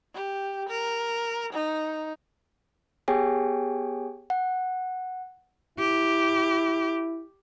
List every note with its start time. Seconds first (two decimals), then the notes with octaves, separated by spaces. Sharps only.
0.14 G4
0.69 A#4
1.53 D#4
3.08 B3 G4 G#4 C#5 G5 G#5
4.30 F#5
5.79 E4 G4